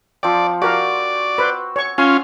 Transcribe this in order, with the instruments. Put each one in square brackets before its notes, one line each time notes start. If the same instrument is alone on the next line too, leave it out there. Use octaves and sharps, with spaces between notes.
[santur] F3 C4 [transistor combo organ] D5
[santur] F#4 [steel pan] G4 A#4 F5 [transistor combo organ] D5
[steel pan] B4 C5 [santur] E6
[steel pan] C#5 C#6
[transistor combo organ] C#4 F4 [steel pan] G#5 C6